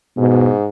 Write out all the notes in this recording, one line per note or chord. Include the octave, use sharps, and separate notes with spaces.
G#2 B2